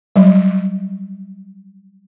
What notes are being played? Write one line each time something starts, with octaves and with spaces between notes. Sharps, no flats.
F#3 G3